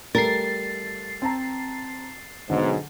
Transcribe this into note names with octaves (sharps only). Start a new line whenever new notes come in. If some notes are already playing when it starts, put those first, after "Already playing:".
G3 A3 A#4 A6 C7
C4 A5 A#5
B1 G#2 D3